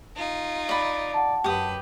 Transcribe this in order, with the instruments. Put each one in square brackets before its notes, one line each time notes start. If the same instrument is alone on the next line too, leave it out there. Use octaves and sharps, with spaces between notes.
[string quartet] D#4 F4
[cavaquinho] D5 B5
[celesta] F#5 A5
[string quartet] F#2 B4 [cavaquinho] G4 D#6